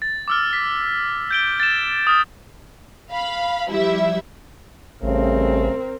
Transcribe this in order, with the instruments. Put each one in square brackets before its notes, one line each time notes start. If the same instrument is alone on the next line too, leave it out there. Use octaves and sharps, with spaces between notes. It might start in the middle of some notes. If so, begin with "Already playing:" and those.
[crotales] A6
D6 E6 F6
B6
G6 D7 G7
A6 E7
D#6 F6 A6
[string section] F5 B5
F3 G3 E4 E5
[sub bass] A1 [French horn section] C#3 G3 A3 [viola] C4 A#4